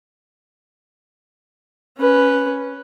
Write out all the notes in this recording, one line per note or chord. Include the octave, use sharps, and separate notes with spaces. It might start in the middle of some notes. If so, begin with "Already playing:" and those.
C#4 B4